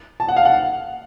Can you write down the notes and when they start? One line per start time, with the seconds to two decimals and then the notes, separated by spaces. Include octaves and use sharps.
0.20 A5
0.28 F#5
0.37 F5
0.45 F#5